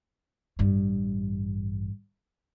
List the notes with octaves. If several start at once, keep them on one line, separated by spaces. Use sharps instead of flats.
A1 G2